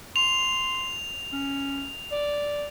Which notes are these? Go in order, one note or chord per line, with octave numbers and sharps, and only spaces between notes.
C6 F7
C#4
D5